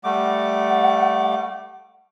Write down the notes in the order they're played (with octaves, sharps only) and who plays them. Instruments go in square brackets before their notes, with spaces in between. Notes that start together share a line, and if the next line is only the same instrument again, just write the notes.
[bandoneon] G3 A3 D6 [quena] F#5